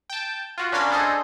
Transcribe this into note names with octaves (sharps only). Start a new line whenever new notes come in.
G5 A5
F4 F#4
C#4 D4 A#4 F5 B5 C6
D4 G#4 A4 C5 D#5